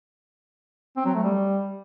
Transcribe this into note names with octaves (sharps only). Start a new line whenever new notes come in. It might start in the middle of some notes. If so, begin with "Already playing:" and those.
C4
F#3
A3
G3